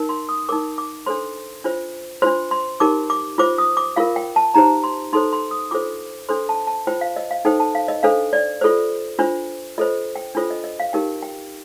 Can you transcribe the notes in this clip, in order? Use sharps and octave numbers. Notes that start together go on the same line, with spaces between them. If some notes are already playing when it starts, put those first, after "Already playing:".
Already playing: D#4 A#4
C6
D#6
D#4 A#4 D6
D6
D4 A4 C5 C6
D4 F4 C5
D4 F4 C5 C6
C6
D#4 G4 A#4 D6
D6
F4 C5 D6
D#6
D6
F4 A#4 F5
G5
A5
D#4 G4 C5 A#5
C6
D#4 A4 C5 C6
C6
D#6
D4 F4 A4 C5 D6
D4 A4 C5 C6
A5
A5
F4 C5 G5
F5
D#5
F5
D#4 A4 C5 G5
A5
F5
D#5
D4 A4 C5 F5
D5
F4 A4 C5
D4 F4 C5
F4 A4 C5 D#5
G5
D4 F4 A4 C5
D#5
D#5
F5
D#4 G4 A#4 G5
G5